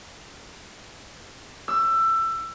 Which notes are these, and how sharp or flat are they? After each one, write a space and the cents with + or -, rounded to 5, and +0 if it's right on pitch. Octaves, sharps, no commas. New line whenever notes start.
E6 +20